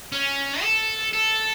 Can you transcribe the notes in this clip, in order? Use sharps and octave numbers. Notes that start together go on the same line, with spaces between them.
C#4
A4
A4